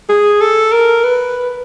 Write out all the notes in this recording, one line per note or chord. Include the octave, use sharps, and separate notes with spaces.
G#4
A4
A#4
B4